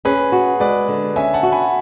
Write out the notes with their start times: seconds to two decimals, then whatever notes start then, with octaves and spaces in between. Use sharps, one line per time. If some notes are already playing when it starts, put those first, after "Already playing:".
0.05 C#4 G#4 B4
0.32 F#4
0.60 G#3 B4 D5
0.88 D3
1.16 C#4 E5 G#5
1.34 F#5 A5
1.43 F#4
1.52 G#5 B5